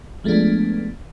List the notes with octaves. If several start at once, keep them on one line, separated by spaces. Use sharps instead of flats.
F3 G#3 A3 B3 D4